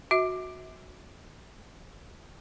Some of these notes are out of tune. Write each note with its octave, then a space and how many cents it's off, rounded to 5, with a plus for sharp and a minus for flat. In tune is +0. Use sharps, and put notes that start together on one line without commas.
F#4 -10 E5 -40